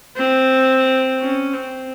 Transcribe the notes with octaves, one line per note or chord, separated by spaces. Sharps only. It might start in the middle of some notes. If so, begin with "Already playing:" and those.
C4
C#4
C4